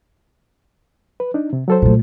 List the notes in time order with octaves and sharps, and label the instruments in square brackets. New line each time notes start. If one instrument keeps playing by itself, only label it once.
[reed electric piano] B4
D4 D#4
C3
F#3 A4 C5
[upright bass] A#2 A3